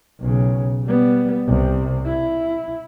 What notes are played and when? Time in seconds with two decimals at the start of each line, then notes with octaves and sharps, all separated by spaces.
0.20 B1 C#3
0.85 G3 B3
1.47 C2 C3
2.06 E4